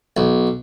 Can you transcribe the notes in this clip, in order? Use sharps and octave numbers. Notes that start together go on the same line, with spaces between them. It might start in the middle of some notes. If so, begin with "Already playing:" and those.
B1